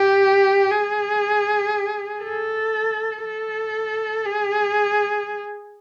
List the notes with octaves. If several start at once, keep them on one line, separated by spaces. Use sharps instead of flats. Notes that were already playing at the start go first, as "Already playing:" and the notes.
Already playing: G4
G#4
A4
A4
G#4